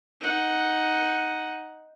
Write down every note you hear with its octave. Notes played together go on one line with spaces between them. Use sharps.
D#4 F#5